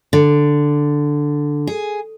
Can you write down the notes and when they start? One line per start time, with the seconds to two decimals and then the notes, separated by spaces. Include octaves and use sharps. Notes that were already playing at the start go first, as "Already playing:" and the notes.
0.13 D3
1.67 G#4